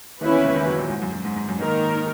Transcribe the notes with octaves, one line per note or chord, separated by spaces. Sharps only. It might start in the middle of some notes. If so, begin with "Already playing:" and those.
D#2 D#3 C#4 E4 B4
E2 E3
C#2 C#3
D#2 D#3
F#2 F#3
A#1 A#2
G#2
F#2
F#2
G#2
G#2
F#2
G#2 D#3 A#3 D#4 A#4